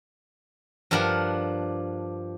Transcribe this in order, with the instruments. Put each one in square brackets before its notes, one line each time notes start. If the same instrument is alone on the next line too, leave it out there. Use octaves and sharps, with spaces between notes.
[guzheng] G2 F3 D4 A#4 F#5